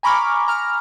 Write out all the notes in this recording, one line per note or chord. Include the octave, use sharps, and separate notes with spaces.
G#5 A#5 B5 C#6 D6 F6
A#5 F6